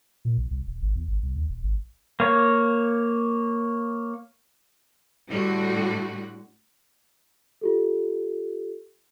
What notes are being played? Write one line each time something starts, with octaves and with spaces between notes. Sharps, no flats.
A#2
B1
C2
D#1
G#1
E2
G#1
C2
D#2
D#1
G#1
A#3 C#5
A2 D3 G3 F#4
F4 G4 A4